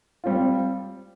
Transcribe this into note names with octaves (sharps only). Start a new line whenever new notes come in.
G3 C4 F4